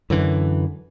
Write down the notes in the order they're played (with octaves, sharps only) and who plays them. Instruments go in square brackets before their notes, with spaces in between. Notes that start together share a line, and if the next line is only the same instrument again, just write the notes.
[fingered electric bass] F#2 D3 E3